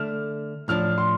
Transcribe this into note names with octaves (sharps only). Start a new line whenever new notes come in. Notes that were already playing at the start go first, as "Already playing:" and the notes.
Already playing: D3 A3 D4 F6
A2 F3 D4 F6
C6